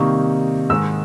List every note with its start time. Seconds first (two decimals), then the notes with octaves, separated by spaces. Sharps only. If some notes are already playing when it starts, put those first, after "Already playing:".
Already playing: C3 D#3 G3 A#3 D#4 C#6
0.69 G#2 D#3 G#3 E6